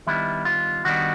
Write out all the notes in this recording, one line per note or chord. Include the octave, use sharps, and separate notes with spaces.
D#3 G3 B3 D4 E4
F4
D#3 G3 B3 D4 F#4